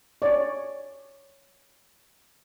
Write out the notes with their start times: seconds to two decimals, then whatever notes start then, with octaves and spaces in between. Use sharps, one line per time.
0.22 C#5 D5